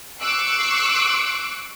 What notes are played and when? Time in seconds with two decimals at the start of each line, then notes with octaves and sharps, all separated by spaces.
0.21 C#6 D6 E6 F#6 C7 C#7